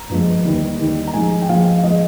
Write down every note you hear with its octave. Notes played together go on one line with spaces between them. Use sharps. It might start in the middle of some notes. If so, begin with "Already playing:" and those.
Already playing: A#5
G2 F3 G#3
D#2 D#3 G3
D#2 D#3 G3
A#5
G#2 F3 G#3 G#5
G5
G#2 F3 G#3 F5
F5
F3 G#3 D#5